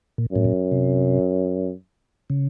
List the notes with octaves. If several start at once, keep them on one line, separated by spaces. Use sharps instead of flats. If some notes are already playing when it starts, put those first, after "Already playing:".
A#2
F#2 A2
A#2
C3
C#3